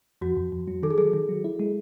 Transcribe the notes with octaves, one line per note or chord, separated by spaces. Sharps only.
F2 F#4
F2
F2
F#3
D#3 A4
G#4
F#3 A4
D#3
F#3
E4
G#3